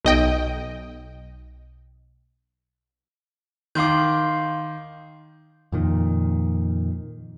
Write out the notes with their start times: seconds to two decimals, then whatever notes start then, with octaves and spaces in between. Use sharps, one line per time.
0.05 B1 D#5 G5
3.75 D#3 F5 C6 D6 G6
5.72 F2 A#2 D#3